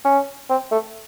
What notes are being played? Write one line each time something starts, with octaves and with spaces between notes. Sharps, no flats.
C#4
C4
A3